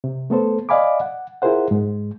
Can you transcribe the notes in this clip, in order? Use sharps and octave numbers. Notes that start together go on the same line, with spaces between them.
C3
A3 B3 A4 C5
D5 D#5 F5 G#5 B5 D6
F#5
E4 F4 G#4 A#4 C5 F#5
G#2 G#3